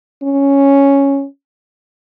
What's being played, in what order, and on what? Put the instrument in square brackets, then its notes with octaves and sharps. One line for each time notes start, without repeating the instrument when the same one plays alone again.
[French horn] C#4